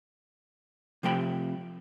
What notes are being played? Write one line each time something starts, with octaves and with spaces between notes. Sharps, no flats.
C3 F3 A3 G5 B5